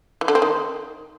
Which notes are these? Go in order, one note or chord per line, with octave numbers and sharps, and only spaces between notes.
E3
D3
C4
D#3